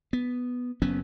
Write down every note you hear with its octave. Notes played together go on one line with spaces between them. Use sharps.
B3
F#1 F#3 B3 C#4